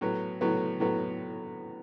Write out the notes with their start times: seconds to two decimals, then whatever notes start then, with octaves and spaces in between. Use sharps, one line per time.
0.01 A2 F#3 B3
0.41 A2 F#3 B3
0.80 A2 F#3 B3